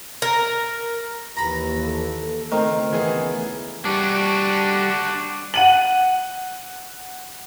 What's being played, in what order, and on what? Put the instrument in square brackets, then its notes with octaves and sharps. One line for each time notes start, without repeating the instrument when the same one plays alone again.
[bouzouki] A#4
[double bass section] D#2 E3 [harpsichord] A#5 B5
[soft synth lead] A4
[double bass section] C#2 [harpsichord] D#3 [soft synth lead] A3 [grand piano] C4 F6
[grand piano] E3 B3 G#4
[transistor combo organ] G3 D6 [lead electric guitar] D4 F#4
[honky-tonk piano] F#5 D#7 F#7